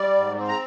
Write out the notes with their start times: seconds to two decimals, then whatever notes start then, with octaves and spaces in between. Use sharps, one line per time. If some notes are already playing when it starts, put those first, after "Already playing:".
Already playing: G3 D5
0.16 G#2
0.37 C4
0.48 A#5